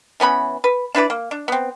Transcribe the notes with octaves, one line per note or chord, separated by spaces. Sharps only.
E3 B3 C#4 B5
B4
D4 E4 B4 D5
A#3
D4
B3 C4